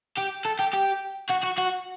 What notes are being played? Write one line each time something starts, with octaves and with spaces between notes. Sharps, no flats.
G4
A4
G4
G4
F#4
F#4
F#4